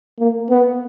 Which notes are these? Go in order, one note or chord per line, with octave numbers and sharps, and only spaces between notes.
A#3
B3